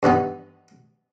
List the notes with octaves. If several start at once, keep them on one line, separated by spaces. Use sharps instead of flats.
G2 E3 B3 D#4